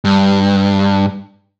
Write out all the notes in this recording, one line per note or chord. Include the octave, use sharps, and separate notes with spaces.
G2